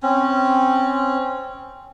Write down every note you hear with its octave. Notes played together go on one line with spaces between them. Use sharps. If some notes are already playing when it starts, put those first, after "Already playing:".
C4 C#4